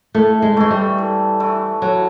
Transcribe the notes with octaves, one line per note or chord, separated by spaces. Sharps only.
A2 A3
G#3
E3 G#3 A3
G3
A2
E3 A3
A2 F#3